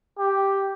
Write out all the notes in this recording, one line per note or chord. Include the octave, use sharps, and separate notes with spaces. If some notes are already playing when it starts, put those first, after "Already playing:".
G4